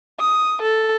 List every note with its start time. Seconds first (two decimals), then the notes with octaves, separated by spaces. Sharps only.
0.20 D#6
0.62 A4